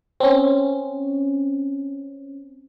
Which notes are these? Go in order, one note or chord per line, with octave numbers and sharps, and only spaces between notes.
C4 C#4